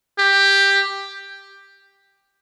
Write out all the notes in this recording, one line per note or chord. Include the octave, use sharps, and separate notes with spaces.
G4